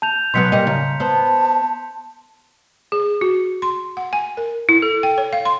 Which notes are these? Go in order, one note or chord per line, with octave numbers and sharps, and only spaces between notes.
A5 G6 F7
B2 F#3 B3 C6 B6 C#7
G3 A#3 D#5
C#3 A#5
B3 C5 A5
G#4
F#4
C6
F#5
G#5
A#4
E4
A4
G5
C#5
F5
C6